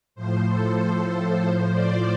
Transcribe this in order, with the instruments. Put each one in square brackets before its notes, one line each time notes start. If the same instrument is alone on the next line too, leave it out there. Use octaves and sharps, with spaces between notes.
[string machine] A2 F3 C5
A4
C5
A2 F3
D5